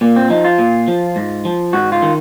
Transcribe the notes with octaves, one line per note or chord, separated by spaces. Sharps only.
A#2 A#3
C4
F3 D#4
F4
A#2
F3
G#2
F3
G#2 F#4
F4
D#3